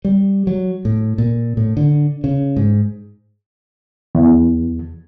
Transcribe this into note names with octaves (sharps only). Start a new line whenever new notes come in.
G3
F#3
A2
A#2
A2
D3
C#3
G#2
E2